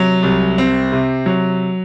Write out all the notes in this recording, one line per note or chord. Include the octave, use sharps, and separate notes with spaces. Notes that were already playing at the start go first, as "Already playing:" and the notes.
Already playing: C3 F#3
C2
C4
C3
F#3